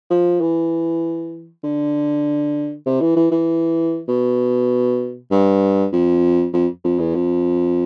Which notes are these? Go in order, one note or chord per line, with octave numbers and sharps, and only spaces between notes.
F3
E3
D3
C3
E3
E3
E3
B2
G2
F2
F2
F2
E2
F2